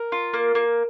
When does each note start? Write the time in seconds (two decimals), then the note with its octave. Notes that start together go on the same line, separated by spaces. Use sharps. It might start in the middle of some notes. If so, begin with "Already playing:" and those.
Already playing: A#4
0.12 F4
0.33 A#3
0.55 A#3